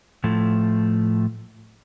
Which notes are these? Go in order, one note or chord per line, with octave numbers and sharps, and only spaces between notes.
A2 F3 A3